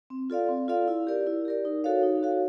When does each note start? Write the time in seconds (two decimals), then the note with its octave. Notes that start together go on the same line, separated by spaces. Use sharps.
0.10 C4
0.30 F4 A4 D5 F5
0.48 C4
0.68 F4 A4 D5 F5
0.88 E4
1.07 G4 A#4 D5
1.27 E4
1.45 G4 A#4 D5
1.65 D#4
1.84 F#4 A4 C#5 F5
2.03 D#4
2.23 F#4 A4 C#5 F5